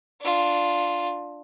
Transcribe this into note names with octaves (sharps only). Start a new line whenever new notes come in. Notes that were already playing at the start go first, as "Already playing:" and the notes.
D4 F4